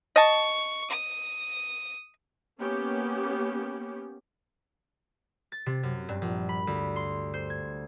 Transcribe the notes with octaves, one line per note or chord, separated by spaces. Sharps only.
D#5 A5 C#6
D#6
A#3 B3 C#4 G4
A6
C3
F#2
G2
A#1
B5
D2
C6
C5
G#6